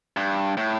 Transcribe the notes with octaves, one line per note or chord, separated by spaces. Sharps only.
G2
A2